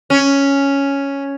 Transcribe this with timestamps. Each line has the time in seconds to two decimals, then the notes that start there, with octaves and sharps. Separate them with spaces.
0.10 C#4